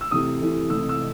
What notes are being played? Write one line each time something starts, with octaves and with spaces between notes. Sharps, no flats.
E6
C3 E3 A3 D#6
C3 E3 A3
C3 E3 A3 E6
E6